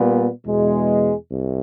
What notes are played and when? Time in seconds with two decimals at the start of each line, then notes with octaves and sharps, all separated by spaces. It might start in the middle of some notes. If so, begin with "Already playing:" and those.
Already playing: A#2 G3 B3
0.46 E2 B2 G#3
1.32 C2